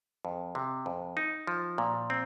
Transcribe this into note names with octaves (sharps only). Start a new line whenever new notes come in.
F2
C3
F2
D#4
F3
A#2
C4